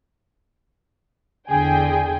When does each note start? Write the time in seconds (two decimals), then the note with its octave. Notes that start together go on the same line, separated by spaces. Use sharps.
1.48 E2 D3 G#4 G5 G#5